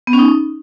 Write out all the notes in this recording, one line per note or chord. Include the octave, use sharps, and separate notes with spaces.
B3
C#4
D#4